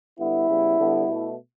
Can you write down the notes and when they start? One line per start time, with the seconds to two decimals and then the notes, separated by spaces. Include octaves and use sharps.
0.18 D3 G3 B3 E4
0.48 C#3 G3 B3
0.78 D3 G3 B3
1.08 B2 A3